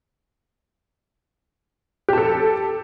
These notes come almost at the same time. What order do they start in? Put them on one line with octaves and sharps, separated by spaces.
G4 A5 A4